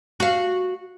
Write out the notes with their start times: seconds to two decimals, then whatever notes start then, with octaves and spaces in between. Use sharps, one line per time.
0.20 F#4 F5